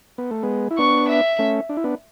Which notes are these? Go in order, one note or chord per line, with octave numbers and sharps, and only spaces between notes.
B3
A3
G#3 B3
E4
B3 D4 C#6
E5
A3 C#4
D4
E4
B3 D4